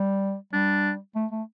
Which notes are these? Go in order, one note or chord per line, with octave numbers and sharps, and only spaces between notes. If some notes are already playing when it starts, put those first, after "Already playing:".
Already playing: G3
G3 D4
A3
A3